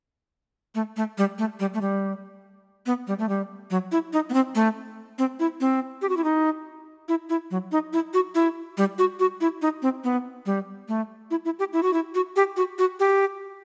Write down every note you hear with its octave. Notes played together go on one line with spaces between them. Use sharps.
A3
A3
G3
A3
G3
A3
G3
B3
G3
A3
G3
F#3
E4
D#4
B3
C4
A3
C4
E4
C4
G4
F#4
E4
D#4
E4
E4
F#3
D#4
E4
F#4
E4
G3
F#4
F#4
E4
D#4
C4
B3
G3
A3
E4
E4
G4
E4
F#4
E4
F#4
G4
F#4
F#4
G4